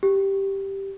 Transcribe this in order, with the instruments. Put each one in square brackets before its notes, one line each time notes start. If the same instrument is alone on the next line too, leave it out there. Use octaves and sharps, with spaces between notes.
[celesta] G4